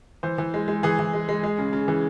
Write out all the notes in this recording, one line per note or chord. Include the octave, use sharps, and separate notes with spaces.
E3 C5
E3
G#3
G#3
E3 G#4
E3
G#3
G#3
G#3
C#3
C#3
E3